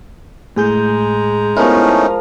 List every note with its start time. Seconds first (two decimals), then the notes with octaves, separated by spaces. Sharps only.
0.56 A2 G#3 G#4 A#5 G6
1.57 F3 A3 B3 C#4 D#4 E4 A#4